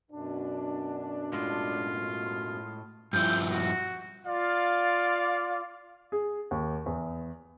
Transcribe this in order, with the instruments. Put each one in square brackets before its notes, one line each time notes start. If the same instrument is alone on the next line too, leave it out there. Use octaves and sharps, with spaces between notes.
[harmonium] F#2 B2 [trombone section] D4
[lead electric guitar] A2 G#3 [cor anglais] F4
[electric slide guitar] G2 F3 E4 [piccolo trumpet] G6
[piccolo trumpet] F#4
[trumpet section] F4 D5 F5
[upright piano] G#4
D#2
E2